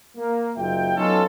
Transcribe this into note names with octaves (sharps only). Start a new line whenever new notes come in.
A#3
F#1 D#4 F4 E5 G5
F#3 B3 C#4 D#4 F4 A4